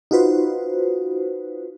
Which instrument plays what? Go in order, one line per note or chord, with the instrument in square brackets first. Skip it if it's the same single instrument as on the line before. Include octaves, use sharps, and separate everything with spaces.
[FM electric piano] D#4 F4 F#4 B4 C5